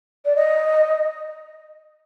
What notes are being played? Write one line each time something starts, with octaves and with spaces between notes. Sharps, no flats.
D5
D#5